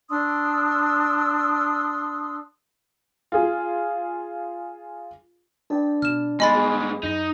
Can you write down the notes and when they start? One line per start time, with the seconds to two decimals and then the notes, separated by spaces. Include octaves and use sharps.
0.09 D4 C6 D#6 E6
3.32 F4 G#4
5.70 D4 B4 D5 G5
6.02 B2 F6 E7
6.40 G2 G#3 B3 D#5 G#5 B5 C6 A6
6.55 G#4
7.03 F#2 D#4 A#6